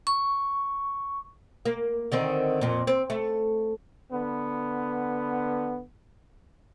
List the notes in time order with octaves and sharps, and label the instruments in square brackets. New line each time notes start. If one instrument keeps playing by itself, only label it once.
[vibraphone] C#6
[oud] A#3
D3 D#3 C4
F2 A#2
C4
A3
[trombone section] D3 B3